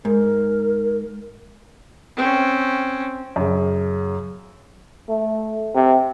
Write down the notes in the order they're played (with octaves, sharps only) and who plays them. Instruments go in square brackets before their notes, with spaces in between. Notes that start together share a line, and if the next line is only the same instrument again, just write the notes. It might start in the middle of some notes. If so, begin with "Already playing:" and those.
[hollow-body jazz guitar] G#2 [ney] A#4
[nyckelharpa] C4 C#4
[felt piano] F#2 C#3
[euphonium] A3
C3